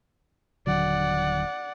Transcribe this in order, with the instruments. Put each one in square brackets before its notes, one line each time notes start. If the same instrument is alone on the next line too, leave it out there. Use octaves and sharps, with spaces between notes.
[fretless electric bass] D#1 D3 F#3 [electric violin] D5 F#5